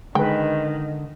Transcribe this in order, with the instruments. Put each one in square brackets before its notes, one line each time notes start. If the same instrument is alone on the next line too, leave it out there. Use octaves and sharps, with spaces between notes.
[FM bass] D3 [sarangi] D#3 [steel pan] G#3 B4 [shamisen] G5